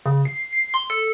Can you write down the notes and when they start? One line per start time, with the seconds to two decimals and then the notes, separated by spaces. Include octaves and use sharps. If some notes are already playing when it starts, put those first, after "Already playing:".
0.06 C#3
0.25 C7
0.53 C7
0.74 C6
0.90 A4